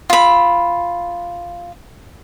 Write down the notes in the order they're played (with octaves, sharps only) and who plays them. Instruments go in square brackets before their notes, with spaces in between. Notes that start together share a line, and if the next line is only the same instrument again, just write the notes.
[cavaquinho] F4 B5